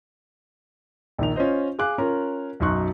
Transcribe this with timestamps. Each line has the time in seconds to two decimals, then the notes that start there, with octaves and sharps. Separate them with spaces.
1.18 A#1 D#3 F7
1.36 C#4 F4 C5 D#5
1.79 G#4 F5 D6 F#6
1.98 C#4 F4 A#4
2.60 B1 F#2 D#4 C6 C#6 F#6